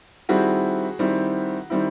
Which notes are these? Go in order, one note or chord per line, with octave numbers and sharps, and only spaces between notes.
D#3 G3 C4 E4 F#4 G#4
D#3 G3 C4 E4
D#3 G3 C4 E4